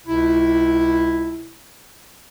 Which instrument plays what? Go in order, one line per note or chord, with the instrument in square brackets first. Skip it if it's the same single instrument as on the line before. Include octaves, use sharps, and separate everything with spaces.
[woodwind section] C#2 C3 E4